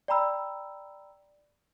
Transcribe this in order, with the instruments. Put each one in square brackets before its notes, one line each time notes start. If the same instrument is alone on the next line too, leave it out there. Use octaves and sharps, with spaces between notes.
[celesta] D5 G5 A#5 B5 E6